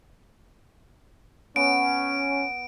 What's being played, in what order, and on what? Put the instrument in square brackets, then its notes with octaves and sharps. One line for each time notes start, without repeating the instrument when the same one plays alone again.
[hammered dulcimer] B3 [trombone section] C#4 [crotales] D7